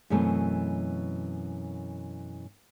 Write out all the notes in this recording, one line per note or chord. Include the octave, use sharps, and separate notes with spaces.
F#2 B2 E3 A3 C4 A5